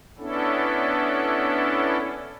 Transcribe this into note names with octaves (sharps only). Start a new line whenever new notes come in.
B3 C#4 D4 E4 A4